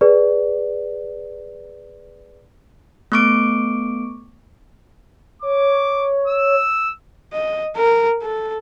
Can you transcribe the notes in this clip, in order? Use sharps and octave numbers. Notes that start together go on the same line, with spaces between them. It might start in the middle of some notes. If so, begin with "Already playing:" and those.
G#4 B4 D5
A3 B3 C#6 D6 D7
C#5 D6
E6
D#5
A#4
A4